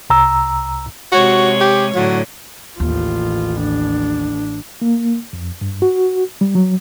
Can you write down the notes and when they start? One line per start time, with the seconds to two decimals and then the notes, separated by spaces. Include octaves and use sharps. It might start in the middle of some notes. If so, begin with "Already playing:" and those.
0.10 C2 A#5 E6
1.12 C3 G#3 F#4 C#5
1.60 G4
1.95 A2 D3 F#3
2.80 A1 D#2 F4
3.60 D4
4.82 A#3
5.33 F2
5.61 G2
5.82 F#4
6.41 G3
6.55 F#3